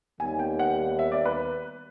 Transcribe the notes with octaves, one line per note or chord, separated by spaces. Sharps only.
D#2 D#3 G3 B3 G#5
G5
F#5
E5
D5
B4